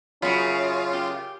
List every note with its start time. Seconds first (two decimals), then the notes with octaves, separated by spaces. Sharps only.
0.22 F#2 C#3 C#4 F4 F#4 B5
0.93 G4